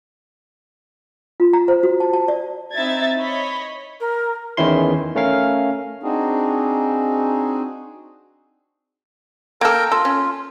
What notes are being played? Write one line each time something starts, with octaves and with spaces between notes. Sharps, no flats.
F4
A#5
C5
F#4
A5
A5
D5
C4 D#4 E4 E5 G#6 A6
C#5 D#5 B5
A#4
E2 D#3 E3 C#4 E4 C6
A3 C#4 A#4 F5
C4 D4 D#4 F#4 G#4
A#3 A4 A#4 G5
F4 A4
C#4